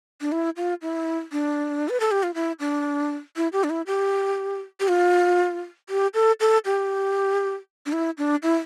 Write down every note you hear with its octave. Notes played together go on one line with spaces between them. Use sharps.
D4
E4
F4
E4
D4
B4
A4
G4
F4
E4
D4
E4
G4
D4
E4
G4
G4
F4
G4
A4
A4
G4
D4
E4
D4
E4